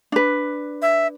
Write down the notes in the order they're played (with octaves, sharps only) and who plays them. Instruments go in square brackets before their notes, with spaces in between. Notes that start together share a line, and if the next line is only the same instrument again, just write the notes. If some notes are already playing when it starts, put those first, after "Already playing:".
[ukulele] D4 B4
[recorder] E5